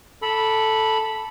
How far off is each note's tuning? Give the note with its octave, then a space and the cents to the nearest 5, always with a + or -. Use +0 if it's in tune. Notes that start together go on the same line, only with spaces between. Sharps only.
A4 +0 B5 -10 D6 -15